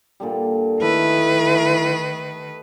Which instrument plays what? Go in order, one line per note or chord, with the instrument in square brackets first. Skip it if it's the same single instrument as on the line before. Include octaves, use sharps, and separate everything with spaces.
[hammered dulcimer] A#2 D3 G3
[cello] D#3 B4 [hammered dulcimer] A3 D#5 [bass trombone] E4